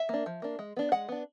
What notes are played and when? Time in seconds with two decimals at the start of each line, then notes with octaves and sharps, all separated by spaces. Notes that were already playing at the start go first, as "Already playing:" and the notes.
Already playing: E5
0.09 A#3 D4
0.26 F3
0.42 A#3 D4
0.59 G#3
0.77 B3 D4
0.92 G#3 F#5
1.09 B3 D4